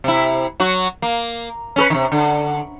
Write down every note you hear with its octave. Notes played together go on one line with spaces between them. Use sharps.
C3 E4
F#3 F#4
A#3
C#4 A4 B4
C3 D#3
D3